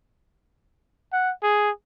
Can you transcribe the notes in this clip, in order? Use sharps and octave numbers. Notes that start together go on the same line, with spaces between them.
F#5
G#4